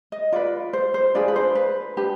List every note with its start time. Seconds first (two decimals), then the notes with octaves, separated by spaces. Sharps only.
0.12 D#5
0.32 F4 B4 D5
0.73 C5
0.94 C5
1.14 D4 F4 G#4 B4 D5
1.28 B4
1.36 C5
1.55 B4
1.97 D4 G4 B4